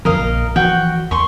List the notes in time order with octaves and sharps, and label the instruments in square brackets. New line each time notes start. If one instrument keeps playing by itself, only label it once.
[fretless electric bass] F#2 D3 F3 [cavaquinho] A#4 D#5 F5
[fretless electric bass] A#1
[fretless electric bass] E3 F3 [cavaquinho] F#4 G5
[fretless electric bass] E2 [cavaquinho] C6 C#6